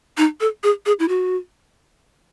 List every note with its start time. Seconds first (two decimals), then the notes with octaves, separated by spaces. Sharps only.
0.18 D#4
0.41 A4
0.63 G#4
0.86 G#4
0.99 E4
1.08 F#4